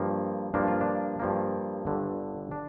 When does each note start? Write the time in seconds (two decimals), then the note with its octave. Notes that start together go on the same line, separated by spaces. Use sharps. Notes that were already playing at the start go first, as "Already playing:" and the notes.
Already playing: G2 F3 A#3
0.54 G2 F3 A#3 D4
0.68 F4
0.81 D4
1.19 G2 F3 A#3
1.85 G1 G2 D3
2.51 D4